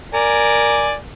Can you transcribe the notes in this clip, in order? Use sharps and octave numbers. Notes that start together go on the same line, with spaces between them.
A#4 D5 G#5